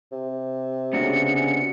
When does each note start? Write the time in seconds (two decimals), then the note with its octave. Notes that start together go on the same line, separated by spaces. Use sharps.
0.12 C3
0.93 C#3 B3 D4 F#4 C#7